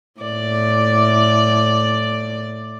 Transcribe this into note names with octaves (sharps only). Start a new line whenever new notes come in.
A2 D5